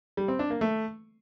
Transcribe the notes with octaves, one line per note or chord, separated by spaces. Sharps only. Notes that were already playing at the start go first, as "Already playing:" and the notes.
G3
C4
D4
A#3
A3